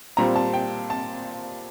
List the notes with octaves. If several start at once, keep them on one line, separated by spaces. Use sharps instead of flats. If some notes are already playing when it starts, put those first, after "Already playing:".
A#2 G3 C4 A#5
A5
G5
A5